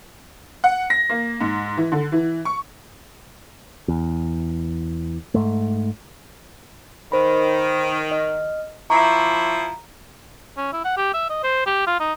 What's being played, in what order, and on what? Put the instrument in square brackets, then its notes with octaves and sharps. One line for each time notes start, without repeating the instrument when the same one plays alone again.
[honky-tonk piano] F#5
A#6
A#3
G#2
E3
D3
E3
C#6
[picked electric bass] E2
G#2 A3
[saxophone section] D#3 [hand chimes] C5 B5
[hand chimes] D#5 F6
[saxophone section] F3 E4 [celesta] A#5 [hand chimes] C#6 D6
[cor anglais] C#4
E4
F#5
G4
E5
D#5
C5
G4
F4
D#4